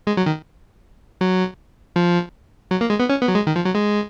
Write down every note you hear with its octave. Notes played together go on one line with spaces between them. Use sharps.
G#3
F#3
D#3
F#3
F3
F#3
A#3
G#3
B3
C#4
B3
F#3
G#3
D#3
F3
F#3
G#3